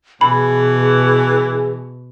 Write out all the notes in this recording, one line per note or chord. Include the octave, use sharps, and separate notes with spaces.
B2 E3 G#4 B5